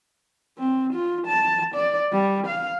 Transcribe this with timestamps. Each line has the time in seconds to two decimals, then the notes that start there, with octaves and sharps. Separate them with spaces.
0.58 C4
0.93 F4
1.27 A5
1.75 D5
2.12 G3
2.47 F5